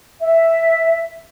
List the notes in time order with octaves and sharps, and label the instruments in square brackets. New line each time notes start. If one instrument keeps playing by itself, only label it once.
[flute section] E5